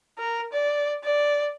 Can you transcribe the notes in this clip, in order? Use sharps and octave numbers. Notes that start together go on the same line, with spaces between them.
A#4
D5
D5